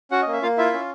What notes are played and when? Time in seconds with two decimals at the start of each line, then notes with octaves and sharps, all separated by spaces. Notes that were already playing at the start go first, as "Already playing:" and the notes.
0.11 C#4 F#4 F#5
0.22 A#3 D#5
0.33 E5
0.42 A#3 F4 F5
0.58 E4 F4 E5
0.73 C#4